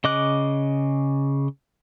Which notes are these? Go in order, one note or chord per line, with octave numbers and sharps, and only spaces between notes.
C#3 D#5 D6 F#6